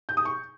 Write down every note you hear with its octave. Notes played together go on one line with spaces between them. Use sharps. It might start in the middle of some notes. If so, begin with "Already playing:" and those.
G6
D#6
C#6